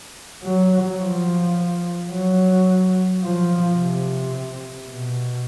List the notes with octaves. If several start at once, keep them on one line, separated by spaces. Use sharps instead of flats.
F#3
F3
F#3
F3
C3
B2